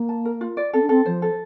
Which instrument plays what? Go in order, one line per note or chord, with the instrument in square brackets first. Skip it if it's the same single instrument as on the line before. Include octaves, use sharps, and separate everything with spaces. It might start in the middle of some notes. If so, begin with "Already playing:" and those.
Already playing: [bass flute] A#3
[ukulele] A5
A#4
F4
D5
[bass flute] C4 [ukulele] A4
[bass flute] D4
[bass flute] C4 [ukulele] A4
[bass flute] F3 [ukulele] C5
[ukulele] A4